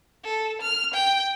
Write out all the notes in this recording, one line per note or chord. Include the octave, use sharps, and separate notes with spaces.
A4
F6
G5